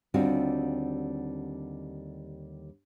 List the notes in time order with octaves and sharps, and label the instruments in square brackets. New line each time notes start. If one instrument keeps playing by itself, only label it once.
[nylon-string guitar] D#2 D3 G3 C4 F4 F#4